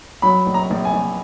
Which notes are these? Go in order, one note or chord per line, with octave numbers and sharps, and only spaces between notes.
F#3 B5
A#1
A#5
A#1
G#5
A#1